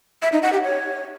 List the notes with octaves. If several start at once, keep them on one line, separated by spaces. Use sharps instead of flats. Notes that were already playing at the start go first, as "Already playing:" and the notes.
E5
D#4
F#5
G4
C#5